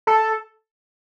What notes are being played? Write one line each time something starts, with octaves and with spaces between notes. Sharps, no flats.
A4